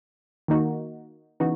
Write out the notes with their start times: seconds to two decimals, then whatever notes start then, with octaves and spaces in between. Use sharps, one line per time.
0.48 D#3 A#3 D#4 F#4
1.40 C#3 E3 B3 D#4 F#4